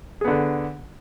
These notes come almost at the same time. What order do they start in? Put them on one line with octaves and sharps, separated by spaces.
G#4 B3 D3